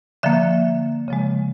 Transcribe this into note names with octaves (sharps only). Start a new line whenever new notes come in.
D3 F3 A#3 E5
C#3 F3 G#3